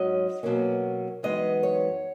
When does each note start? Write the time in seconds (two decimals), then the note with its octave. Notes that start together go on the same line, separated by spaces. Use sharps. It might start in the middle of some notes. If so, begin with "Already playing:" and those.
Already playing: G#2 F#3 C#4 D#5
0.43 B2 F#3 A#3 C#4
1.23 F#2 E3 G#3 B3 D#4 D#5
1.63 C#5